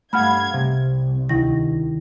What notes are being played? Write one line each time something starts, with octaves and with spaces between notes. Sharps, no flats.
G2 A3 F5 F#5 B5 F6 G#6
C2 C3
D2 D#3 E4 A#6